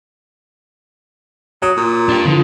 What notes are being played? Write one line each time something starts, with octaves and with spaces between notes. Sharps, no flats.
F#3 D#6
A#2
D4 G4
D3 E3 F3